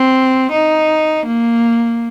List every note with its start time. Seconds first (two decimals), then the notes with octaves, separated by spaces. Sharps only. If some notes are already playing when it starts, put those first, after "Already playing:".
Already playing: C4
0.51 D#4
1.26 A#3